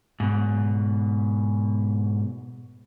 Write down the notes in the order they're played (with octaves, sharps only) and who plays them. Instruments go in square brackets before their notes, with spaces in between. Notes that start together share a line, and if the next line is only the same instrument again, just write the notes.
[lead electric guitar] G#2 B2